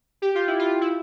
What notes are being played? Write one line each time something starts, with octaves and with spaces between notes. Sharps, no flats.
G4
F4
E4
F4
E4